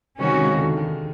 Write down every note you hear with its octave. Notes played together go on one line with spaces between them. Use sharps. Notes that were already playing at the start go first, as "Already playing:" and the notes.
C3 D#3 G#3 C#4 F#4
C#3
D#3
D3
D#3